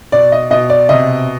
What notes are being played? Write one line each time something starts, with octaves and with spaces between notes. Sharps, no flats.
B2 D5
D#5
B2 D#5
D5
C3 D#5